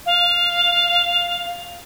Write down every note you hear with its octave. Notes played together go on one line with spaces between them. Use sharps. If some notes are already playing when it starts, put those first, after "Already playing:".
F5